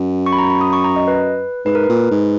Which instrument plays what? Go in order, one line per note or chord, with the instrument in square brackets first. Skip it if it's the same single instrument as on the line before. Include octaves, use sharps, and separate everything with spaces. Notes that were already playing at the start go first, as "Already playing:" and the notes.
Already playing: [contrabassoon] F#2
[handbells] C#6
B5
A#5
B5
D#6
C#6
A#5
D#5
B4
[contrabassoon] G#2 [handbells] B4
[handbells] A#4
[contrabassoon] A#2 [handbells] B4
[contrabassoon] G#2